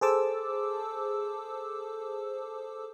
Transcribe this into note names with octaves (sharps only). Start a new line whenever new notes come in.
G#4 A4 C5 A5 D6 E6